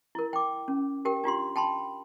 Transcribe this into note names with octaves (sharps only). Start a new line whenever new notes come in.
E4 A#4
G5 D6
C#4
G4 A#4 G5
D4 F4 G4 C6
G5 A5 B5 C6